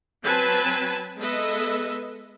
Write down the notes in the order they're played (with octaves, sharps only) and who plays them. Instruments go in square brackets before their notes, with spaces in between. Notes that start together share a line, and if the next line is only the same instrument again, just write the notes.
[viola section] F#3 C4 B4 G#5 A5 B5
G#3 B3 A4 B4 D#5 E5